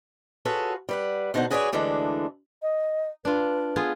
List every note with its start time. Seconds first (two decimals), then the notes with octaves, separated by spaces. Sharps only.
0.45 F4 F#4 G#4 A4 B4 C#5
0.89 G3 B4 F#5
1.34 B2 D3 D#4 A#4 C5 F#5
1.51 F#4 G#4 B4 C#5 D5 G#5
1.73 D2 D3 E3 G#3 D4
2.62 D#5
3.25 D4 F4 B4
3.76 B3 F4 G#4